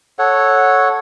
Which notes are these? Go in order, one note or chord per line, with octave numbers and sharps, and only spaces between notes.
A4 C#5 F#5